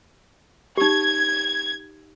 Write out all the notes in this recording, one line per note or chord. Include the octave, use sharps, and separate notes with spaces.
D#4 G4 G#6